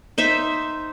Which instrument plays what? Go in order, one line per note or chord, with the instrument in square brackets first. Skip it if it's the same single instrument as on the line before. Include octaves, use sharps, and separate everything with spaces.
[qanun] D#4 C5 E5